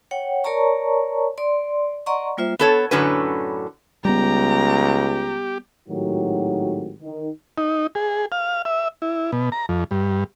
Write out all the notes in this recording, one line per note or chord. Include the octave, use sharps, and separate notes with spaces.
C#5 F#5 G5
A#4 C#5 D5 A5 A#5 C#6
D5 C6
D5 D#5 F#5 A#5 C6 C#6
G3 A#3 F4 C5 E5
B3 A4 C#5
F#2 A2 D3 C#4 F#4 B4
C#2 G3 B3 G4 A#5
G#1 A2 D#3 F#3 F#4 G4
D#3
D#4
G#4
F5
E5
E4
B2
A#5
F2
G2